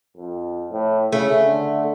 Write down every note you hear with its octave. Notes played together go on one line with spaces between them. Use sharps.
F2
A2
C#3 A3
D3